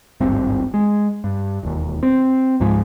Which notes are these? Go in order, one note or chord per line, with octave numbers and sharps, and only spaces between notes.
D1 G#1 G2 C4
G#3
G2
E1 D#2
C4
C#2 G#2 F3 G#3